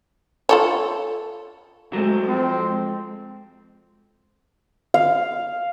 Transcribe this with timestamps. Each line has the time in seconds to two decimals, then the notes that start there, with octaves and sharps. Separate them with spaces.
0.49 F4 A4 C#5
1.93 F#3 G#3 A3 C4
2.28 F2 C4
4.94 F5